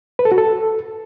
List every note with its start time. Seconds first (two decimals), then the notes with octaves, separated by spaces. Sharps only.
0.19 B4
0.25 A4
0.32 F#4
0.38 A4